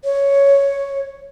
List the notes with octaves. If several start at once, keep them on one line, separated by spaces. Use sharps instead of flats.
C#5